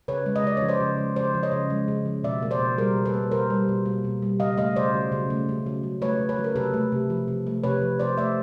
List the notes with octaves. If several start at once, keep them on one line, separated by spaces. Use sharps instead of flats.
C#3 B4 C#5
G#3
D#5
C#3 D5
F3 C#5
C5 D5
C#3
G#3
C#3 C5 D5
F3
C#5 D#5
C#3
G#3
C#3
F3
B2 D5 E5
A#3
C5 D5
B2
G3 G#4 A#4
B2
A4 B4
A#3
B2 A#4 C5
G3
B2
A#3
B2
G3
C#3 D#5 F5
A3 D#5 F5
C#3 C5 D5
F#3
C#3
A3
C#3
F#3
C#3
A3 B4 C#5
C#3
B4 C#5
F#3
A#4
C3 A4 B4
A3
C3
F3
C3
A3
C3 B4 C#5
F3
C3 C5 D5
A3 D5 E5